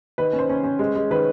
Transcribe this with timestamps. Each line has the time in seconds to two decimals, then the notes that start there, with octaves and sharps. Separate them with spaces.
0.18 D#3 B4
0.33 C#4
0.39 C5
0.49 C#4
0.64 C#4
0.79 G#3
0.95 G#3
1.10 D#3 B4